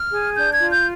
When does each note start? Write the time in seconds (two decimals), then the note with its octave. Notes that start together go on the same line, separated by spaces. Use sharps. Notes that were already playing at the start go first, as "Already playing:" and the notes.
Already playing: F6
0.11 G#4
0.36 D4 G6
0.53 G#6
0.59 F4
0.71 G6